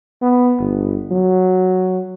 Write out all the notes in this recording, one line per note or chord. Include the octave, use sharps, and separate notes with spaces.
B3
G1
F#3